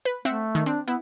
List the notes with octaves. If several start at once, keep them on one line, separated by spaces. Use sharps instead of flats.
B4
A3 C4 E5 F#5
D#3
C4 D4
B3 E4